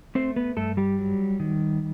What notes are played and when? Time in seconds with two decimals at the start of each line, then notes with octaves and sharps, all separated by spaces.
0.15 A3 C4 C5
0.36 B3 B4
0.57 G2 A3 A4
0.77 G3 G4
0.98 F#3
1.40 D#3